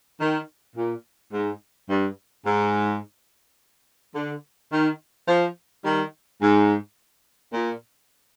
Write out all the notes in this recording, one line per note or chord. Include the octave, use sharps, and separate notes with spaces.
D#3
A#2
G#2
G2
G#2
D3
D#3
F3
D#3 G3
G#2
A#2